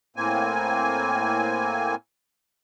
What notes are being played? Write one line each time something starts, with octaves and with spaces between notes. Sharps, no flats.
A2 A#3 C4 G#5